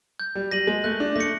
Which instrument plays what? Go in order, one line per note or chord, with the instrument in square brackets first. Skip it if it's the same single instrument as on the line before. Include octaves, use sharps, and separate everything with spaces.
[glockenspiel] G6
[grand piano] G3
[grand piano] G3 [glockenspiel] A#6 D#7 F#7
[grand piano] G#3
[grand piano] A3 [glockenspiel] F#6
[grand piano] D4
[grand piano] A3 [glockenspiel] A#6 C#7